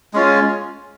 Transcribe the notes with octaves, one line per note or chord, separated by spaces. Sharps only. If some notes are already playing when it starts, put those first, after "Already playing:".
G#3 C#4 F4